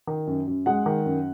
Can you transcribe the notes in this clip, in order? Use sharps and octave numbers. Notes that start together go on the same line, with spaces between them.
D#3
F#2
F#2
G#3 F#5
D#3
F#2